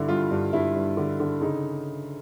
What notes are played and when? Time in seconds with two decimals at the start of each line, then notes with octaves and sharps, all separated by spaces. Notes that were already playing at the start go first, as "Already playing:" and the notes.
Already playing: G2 D3 E4
0.09 G3 F4
0.31 G2
0.53 G2 E4
0.75 G2
0.97 D3
1.20 D3
1.41 C#3 D#4